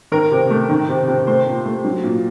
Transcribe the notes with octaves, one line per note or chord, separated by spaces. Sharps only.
D#3 A#4
C3
A3
D#3
C3
C3
A3 C5
A#2
A3
F#3
A#2